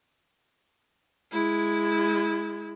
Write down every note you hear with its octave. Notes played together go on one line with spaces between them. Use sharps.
G#3 E4